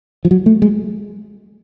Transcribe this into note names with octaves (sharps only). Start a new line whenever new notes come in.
F3
F#3
A3
G#3